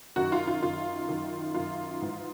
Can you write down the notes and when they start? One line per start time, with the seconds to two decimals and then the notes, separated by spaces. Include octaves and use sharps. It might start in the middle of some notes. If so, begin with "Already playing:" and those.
0.16 F#2 D#3 F#4
0.32 F4
0.47 F4
0.62 F#2 D#3 F4
1.08 F#2 D#3
1.54 F#2 D#3 F4
2.01 G#2 E3